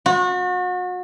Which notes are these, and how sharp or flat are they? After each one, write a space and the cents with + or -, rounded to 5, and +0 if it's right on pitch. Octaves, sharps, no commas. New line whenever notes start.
F#4 -35